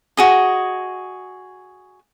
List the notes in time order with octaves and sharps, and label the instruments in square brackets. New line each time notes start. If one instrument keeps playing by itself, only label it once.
[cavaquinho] F#4 G#4 D#5